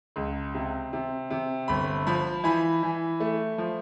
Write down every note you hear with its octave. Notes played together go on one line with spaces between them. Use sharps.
C#2
C3
C3
C3
G1 B5
F3 B5
E3 B5
E3
A3
F3